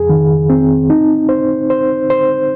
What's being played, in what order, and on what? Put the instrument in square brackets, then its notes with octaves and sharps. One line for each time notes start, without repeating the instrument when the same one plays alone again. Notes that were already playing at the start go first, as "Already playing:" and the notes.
Already playing: [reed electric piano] F2 G#4
D#3
C4
D#4
C5
C5
C5